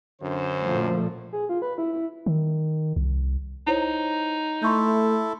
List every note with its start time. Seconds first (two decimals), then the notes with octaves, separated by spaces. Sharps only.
0.22 F#2 D3 C5
0.64 A#2 F3 A3
1.33 G#4
1.49 F4
1.62 B4
1.78 E4
1.92 E4
2.26 D#3
2.96 C2
3.67 D#4 E4 C5 C#5
4.63 A3 E4 A4 C6 C#6 G6